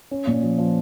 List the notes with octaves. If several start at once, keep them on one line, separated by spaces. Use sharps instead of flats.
C#4
A#2
F3
F3